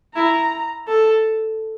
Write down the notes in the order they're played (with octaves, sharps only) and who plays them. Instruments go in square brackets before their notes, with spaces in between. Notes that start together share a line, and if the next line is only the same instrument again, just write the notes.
[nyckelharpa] E4 [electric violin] A#5
[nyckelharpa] A4